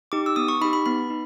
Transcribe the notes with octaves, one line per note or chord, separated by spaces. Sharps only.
D#4 G4 D6
E6
B3 D#6
C#6
D#4 G4 B5
B5
B3 B5
D#4